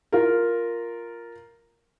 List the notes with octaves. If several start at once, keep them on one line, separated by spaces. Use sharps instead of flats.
F4 A#4